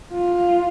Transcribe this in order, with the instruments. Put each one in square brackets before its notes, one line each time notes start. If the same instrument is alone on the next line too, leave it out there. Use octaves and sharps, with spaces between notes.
[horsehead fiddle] F4